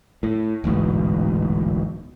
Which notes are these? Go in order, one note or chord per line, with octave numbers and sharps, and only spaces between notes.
A2
D1 A1 G#2 B2